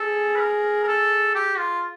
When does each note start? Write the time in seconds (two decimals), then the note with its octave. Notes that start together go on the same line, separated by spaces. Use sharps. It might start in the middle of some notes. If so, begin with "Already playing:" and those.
Already playing: G#4 A4
0.36 B4
0.40 A#4
0.83 A#4
0.88 A4
1.35 G4
1.58 F4